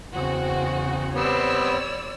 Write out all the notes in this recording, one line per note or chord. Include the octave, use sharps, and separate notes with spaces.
E2 C#3 C4 F#4
G3 B3 C4 C#5 D5 E6